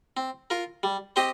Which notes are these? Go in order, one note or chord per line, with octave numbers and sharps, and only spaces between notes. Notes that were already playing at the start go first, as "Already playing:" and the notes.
C4
F4 A#4
G3
C4 G4 C5 D#5